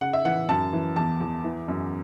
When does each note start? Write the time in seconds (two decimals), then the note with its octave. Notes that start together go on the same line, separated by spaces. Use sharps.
0.01 C#3 F#5
0.13 E5
0.25 E3 F#5
0.49 F#2 A5
0.73 E3
0.96 E2 A5
1.20 E2
1.44 E3
1.68 F#2